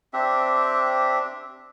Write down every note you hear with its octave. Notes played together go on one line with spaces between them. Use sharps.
C4 D4 G4 E5